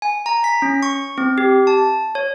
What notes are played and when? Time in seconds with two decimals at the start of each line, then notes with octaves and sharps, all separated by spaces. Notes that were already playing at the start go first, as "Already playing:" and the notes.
0.02 G#5
0.26 A#5
0.44 B6
0.62 C#4
0.83 C#6
1.18 C4
1.38 G4
1.67 A5
2.15 C#5